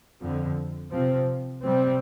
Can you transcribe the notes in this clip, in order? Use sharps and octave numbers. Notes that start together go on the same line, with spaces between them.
F2 D3 F3
C3 F3 C4
C3 G3 C4